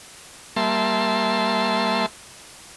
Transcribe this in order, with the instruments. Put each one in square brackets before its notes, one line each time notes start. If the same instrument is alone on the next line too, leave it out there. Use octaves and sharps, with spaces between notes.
[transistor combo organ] G3 A#3 E5 A5 C6